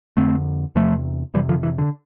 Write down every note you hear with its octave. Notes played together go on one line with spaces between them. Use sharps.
F2 D3 A3 C4
E2 C3 F3 A3
F2 C3 E3 G3
D3 F3
E3
D3